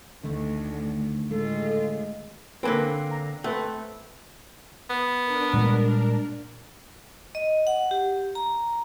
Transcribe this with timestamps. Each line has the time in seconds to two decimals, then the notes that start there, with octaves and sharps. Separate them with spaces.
0.23 D2 D3 D#3 A3
1.31 A2 G#3 F4 A4
2.63 D3 A#3 C4 A4 B4 G#5
3.11 A#5
3.44 A3 C4 B4 F#5
4.90 B3
5.24 D4 A#4
5.53 A#2 G3 G#3
7.35 D#5
7.67 F#5
7.91 G4
8.35 A#5